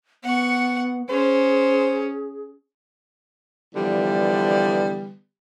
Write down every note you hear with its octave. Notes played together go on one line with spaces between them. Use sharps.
B3 F#5 C#6
C#4 G#4 C5
D3 E3 F3 G3 B3